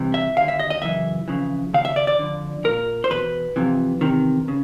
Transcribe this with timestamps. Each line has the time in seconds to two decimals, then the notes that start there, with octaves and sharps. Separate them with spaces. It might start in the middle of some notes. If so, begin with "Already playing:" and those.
Already playing: C2 C3 E3
0.14 E5
0.37 D#2 D3 F5
0.48 E5
0.59 D#5
0.70 D#5
0.82 F#2 C#3 E3 E5
1.28 F2 C#3 E3
1.74 D#2 C#3 F5
1.85 E5
1.96 D5
2.07 D5
2.19 F2 D3
2.64 C2 A#2 A#4
3.04 C5
3.10 E2 B2 B4
3.56 F2 C3 E3
4.01 E2 C3 D#3
4.48 C#3